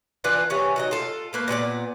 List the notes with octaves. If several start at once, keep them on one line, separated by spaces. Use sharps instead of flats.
E3 B3 D4 F4
C3 E3 B3 C#4
F#3 D#4 D#5
F4 A4
A3 A#3 B4
A#2 B3 A4 D5